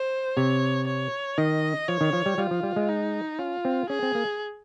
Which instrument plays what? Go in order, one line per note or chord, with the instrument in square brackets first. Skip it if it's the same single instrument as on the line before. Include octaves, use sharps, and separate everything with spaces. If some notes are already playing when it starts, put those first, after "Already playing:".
Already playing: [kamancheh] C5
[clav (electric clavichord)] C3 [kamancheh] C#5
[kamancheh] C#5
[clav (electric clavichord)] D#3 [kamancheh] D#5
[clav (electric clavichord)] F3 [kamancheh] C#5
[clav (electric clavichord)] D#3
F3
G3
[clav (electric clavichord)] G3 [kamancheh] F4
[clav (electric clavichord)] F3
G3
G#3
[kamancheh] D#4
[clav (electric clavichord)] C#4 [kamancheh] F4
[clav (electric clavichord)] C4
[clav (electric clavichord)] C#4 [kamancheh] G#4
[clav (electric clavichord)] C4
A#3